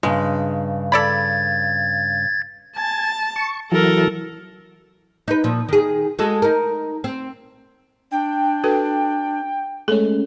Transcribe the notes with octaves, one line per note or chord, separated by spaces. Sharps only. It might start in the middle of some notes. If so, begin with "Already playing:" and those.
G2 C#3 G#3
A4 D5 B5 G#6 A6
G#5 A5
C#6
E3 F#3 A4 A#4
D#4 B4
A#2 F3
D#3 G#4
G#3 F#4 A4
D#4 A#4
C4
D4 G5
F#4 A4 B4
G#3 A3 C#4 A4